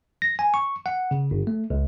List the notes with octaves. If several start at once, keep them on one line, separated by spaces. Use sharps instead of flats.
A#6
G#5
C#6
F#5
C#3
G1
A3
C#2